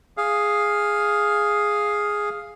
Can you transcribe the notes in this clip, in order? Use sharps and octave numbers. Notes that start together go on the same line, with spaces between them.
G#4 F5